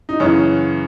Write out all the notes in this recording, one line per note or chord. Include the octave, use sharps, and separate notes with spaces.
D#4
F#2 C#3 E3 C#4